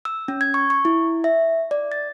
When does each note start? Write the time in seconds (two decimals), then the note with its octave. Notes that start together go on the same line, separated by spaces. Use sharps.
0.05 E6
0.28 C#4
0.41 G#6
0.54 C#6
0.70 C#6
0.85 E4
1.24 E5
1.71 D5
1.92 A6